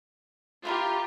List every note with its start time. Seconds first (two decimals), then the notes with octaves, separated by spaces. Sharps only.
0.65 D3 E4 F4 G4 A#4